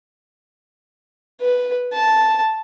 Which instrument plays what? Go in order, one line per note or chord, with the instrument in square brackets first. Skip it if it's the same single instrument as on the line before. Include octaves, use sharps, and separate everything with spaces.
[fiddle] B4
A5